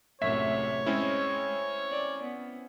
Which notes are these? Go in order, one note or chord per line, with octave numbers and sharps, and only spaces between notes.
A#1 F#2 A2 C3 C#5 E5 B6
G#3 C4 C#4 E4
D5
B3